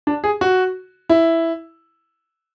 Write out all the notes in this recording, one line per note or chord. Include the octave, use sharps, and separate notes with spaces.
D4
G#4
F#4
E4